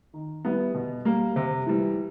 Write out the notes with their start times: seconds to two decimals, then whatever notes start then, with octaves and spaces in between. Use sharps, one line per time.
0.14 D#3
0.45 G3 B3 E4
0.74 B2
1.05 G3 A#3
1.36 C3
1.67 E3 G3